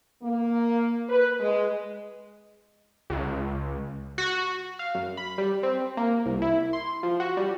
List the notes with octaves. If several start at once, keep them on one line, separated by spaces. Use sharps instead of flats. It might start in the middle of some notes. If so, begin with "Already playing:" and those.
A#3
B4
G#3
C#2
F#4
F5
F#2
B5
G3
C4
A#3
C2
E4
C6
F3
F#4
G3